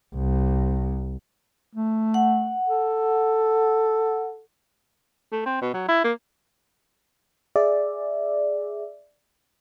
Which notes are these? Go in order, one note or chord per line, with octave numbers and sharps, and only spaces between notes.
C2
A3
F#5
A4
A3
C4
B2
F#3
E4
A#3
G#4 D5 E5